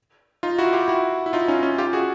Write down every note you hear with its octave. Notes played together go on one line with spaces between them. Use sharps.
D#4 F4
E4 F#4
F4 G4
E4 F#4
E4
D#4 F4
C#4 D#4
C#4 D#4
F4 G4
F#4 G#4